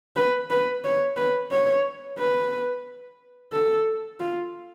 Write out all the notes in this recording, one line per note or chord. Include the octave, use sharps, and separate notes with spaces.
B4
B4
C#5
B4
C#5
B4
A4
F4